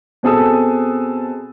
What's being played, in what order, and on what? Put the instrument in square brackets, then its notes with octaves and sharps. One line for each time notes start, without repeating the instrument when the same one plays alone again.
[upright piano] B2 C4 G#4 A4 D#6 E6